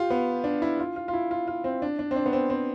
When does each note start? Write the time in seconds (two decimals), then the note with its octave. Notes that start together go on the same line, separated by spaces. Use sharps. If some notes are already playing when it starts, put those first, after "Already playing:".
Already playing: F4 G4
0.10 B3
0.44 D4
0.62 E4
0.79 F4
0.96 F4
1.08 F4
1.14 E4
1.31 F4
1.48 F4
1.64 C4
1.82 D4
1.99 D4
2.11 C4
2.16 D4
2.26 B3
2.33 C4
2.50 C4